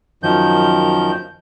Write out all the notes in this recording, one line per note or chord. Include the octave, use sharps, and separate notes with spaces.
F#2 D#3 F3 G6